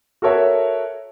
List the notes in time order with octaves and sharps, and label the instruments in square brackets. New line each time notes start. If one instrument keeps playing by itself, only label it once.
[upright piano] F#4 A4 A#4 C#5 E5